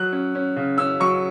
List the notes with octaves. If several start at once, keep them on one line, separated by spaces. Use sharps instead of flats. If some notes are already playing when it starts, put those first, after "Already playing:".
Already playing: F#3 F#6
C#4
C#4
C#3
C#4 E6
F#3 C#6